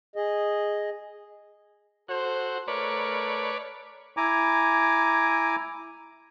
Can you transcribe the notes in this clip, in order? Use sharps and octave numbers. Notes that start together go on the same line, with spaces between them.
G#4 D#5
F#4 A4 C5
A3 A#4 B4 C#5 D5
E4 G#5 A#5 D6